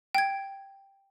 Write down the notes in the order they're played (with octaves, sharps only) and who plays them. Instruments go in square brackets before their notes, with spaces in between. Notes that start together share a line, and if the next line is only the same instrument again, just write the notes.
[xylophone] G5 G#6